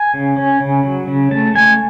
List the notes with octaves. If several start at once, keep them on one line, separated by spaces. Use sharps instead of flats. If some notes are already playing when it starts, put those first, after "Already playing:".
Already playing: G#5
C#3
C#4
C#3
F#3
C#3
A3 A5
A3 G#5